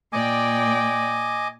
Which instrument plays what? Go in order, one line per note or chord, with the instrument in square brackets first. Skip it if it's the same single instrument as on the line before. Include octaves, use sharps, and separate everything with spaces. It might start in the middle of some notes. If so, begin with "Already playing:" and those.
[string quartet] A#2 D5 G5 [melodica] D#5 G#5 D6